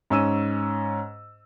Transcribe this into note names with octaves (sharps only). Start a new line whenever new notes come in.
G#2 C#4 E6 D#7